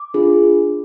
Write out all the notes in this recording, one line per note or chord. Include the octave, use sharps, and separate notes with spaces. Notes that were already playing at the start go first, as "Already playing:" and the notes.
Already playing: D6
D4 F4 G#4